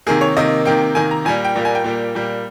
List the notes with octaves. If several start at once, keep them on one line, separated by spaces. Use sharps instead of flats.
C3 D#3 A#3 G#4
C#5
C3 D#3 A#3 D#5
C3 D#3 A#3 G5
C3 D#3 A#3 G#5
A#5
A#2 G3 A#3 G#5
G5
A#2 G3 A#3
G#5
G5
A#2 G3 A#3
A#2 G3 A#3